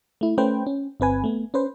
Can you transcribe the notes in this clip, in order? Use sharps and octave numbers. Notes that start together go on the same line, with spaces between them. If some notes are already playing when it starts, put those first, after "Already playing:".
A3 E4
A3 C#4 B4 C5 G5
C#4
G1 C4 B4 G#5
A3 B3
C#4 B4 C5